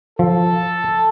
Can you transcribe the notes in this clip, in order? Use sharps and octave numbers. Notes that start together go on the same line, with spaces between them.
F3 A4